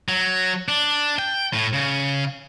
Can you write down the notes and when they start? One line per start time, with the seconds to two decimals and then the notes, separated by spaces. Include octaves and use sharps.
0.09 F#3
0.68 D4
1.19 G5
1.54 A2
1.73 C#3